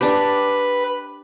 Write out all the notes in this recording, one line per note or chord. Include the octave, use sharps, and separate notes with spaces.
D4 G4 B4